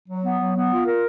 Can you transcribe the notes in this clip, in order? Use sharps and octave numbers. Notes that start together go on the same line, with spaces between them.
F#3
B3
F#3
B3
F4
A#4